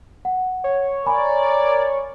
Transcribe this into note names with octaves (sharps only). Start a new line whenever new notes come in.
F#5
C#5
A#4 D5 G#5 B5 C#6